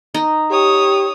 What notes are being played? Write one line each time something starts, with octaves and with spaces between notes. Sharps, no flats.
D#4
G4 C#5 D#6